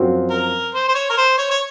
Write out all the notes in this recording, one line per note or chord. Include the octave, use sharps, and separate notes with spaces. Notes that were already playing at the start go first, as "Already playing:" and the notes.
Already playing: F#2 F3 C4 F#4
A#4
C5
C5
C#5
A#4
C5
C#5
C#5